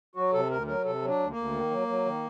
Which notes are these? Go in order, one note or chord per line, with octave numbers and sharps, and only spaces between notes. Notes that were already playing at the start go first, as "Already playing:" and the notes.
F#3 F#4
C3 A4
D2 A#4
F#3 A#4
C3 A4
F#3
D4
D2
A#3
D2
D#3
F#3
F#3
D#3